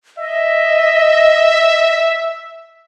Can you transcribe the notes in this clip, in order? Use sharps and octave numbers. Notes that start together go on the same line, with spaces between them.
D#5 E5